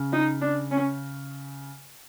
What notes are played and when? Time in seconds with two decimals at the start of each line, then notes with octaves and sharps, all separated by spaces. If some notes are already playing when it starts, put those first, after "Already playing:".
Already playing: C#3
0.13 D#4
0.41 D4
0.71 C#4